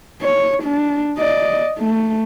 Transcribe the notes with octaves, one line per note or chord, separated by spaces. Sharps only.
C#5
D4
D5 D#5
A3